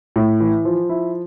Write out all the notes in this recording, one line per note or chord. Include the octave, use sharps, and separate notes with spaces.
A2
E3
F3
E4